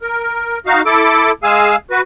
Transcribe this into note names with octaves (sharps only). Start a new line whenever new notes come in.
A#4
D#4 F#4 F5
E4 A4 D6
G#3 G#4 F5 G#5 E6
F#4 B4